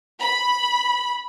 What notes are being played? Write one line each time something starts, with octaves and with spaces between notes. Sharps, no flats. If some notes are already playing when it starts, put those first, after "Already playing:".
B5